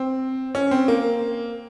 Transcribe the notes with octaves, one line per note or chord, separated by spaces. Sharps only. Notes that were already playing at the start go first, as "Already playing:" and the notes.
Already playing: C4
C#4
C4
A#3